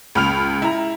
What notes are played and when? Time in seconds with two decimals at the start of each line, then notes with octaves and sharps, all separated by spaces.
0.15 C#2 B5 F6 F7
0.62 E4 A#5